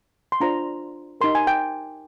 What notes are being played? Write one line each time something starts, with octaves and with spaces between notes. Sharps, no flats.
C6
D4 F4 C5 A#5
D#4 G4 A#4 C6
G#5
G5